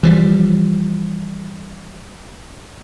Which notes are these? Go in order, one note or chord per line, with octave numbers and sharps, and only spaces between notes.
E3 F3 G3